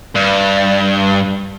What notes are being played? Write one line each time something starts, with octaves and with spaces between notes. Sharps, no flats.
G2